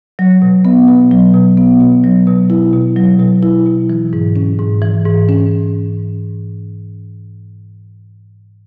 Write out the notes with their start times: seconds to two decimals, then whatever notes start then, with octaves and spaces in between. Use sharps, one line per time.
0.19 F#3
0.42 B2
0.65 B3
0.88 B2
1.11 F#3
1.34 B2
1.57 B3
1.80 B2
2.04 F#3
2.27 B2
2.50 E4
2.73 B2
2.97 F#3
3.20 B2
3.42 E4
3.66 B2
3.90 E3
4.13 G#2
4.36 C#4
4.59 G#2
4.82 E3
5.05 G#2
5.29 C#4